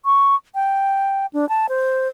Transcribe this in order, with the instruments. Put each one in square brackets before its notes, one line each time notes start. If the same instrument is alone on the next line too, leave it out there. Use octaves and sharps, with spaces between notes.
[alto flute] C#6
G5
D4
A5
C5